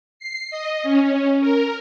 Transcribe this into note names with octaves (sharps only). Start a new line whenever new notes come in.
C7
D#5
C#4
A#4